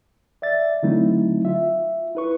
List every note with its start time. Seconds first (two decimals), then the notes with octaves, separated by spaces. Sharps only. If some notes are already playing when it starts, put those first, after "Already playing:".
0.42 D5 E5 A6
0.83 D3 F#3 A3 C4 D#4 E4
1.45 F4 E5
2.15 E4 B4 C#6